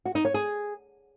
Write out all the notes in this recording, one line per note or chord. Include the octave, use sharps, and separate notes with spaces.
F#4
D#4
C#5
G#4